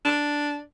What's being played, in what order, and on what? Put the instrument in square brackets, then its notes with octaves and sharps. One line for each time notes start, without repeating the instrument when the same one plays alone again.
[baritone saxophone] D4